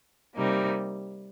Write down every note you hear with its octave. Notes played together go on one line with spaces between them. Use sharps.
C3 G3 A#3 D#4